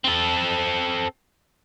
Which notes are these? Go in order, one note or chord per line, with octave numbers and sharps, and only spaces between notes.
C4 A4